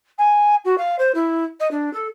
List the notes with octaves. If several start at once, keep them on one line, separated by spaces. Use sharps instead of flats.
G#5
F#4
F5
C5
E4
D#5
D4
A4